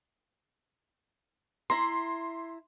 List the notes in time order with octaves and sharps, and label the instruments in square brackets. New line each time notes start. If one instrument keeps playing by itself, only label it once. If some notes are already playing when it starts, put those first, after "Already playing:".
[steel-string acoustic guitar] E4 A#5 [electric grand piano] C6